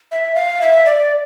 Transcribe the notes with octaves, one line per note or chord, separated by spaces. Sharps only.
E5
F5
E5
D5